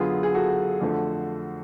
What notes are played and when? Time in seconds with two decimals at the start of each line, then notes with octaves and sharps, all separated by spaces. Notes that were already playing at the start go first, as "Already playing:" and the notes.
Already playing: F#2 D3 F#3 B3 F4 G#4
0.23 G#4
0.34 F#4 A4
0.81 F2 D3 F3 A3